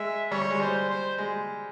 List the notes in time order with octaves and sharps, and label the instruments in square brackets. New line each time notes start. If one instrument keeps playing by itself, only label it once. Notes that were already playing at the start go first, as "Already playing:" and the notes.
Already playing: [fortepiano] G#3 [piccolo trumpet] E5
[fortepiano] G3 [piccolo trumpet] C#5
[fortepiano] G3
G#3
[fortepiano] G3 [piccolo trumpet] C5
[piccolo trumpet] C5
[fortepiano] G#3